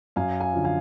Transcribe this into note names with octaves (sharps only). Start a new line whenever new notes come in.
F#2 F5 G#5
F5 G#5
D3 F3
F5 G#5